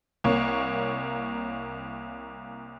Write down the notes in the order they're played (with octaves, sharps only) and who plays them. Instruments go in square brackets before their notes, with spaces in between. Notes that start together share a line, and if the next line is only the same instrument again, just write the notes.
[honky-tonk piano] C2 A#3 C#5